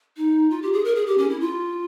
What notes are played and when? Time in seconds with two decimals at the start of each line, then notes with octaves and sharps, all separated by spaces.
0.17 D#4
0.50 F4
0.62 G4
0.73 G#4
0.85 A#4
0.95 G#4
1.06 G4
1.18 C#4
1.29 E4
1.40 F4